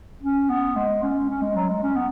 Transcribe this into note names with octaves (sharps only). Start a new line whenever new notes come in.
C#4
B3
G#3
C#4
C#4
G#3
F#3
G#3
C#4
B3